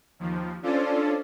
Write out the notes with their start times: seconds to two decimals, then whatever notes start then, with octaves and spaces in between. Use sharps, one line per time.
0.19 D#2 F3
0.63 C#4 D4 F4 A4 C5 D5